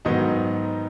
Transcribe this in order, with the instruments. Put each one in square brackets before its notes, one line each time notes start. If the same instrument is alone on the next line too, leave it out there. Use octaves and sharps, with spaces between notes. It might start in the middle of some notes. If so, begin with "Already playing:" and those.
[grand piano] G#2 D#3 F#3 B3 D#4 D#5